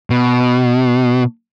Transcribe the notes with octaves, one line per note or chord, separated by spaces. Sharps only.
B2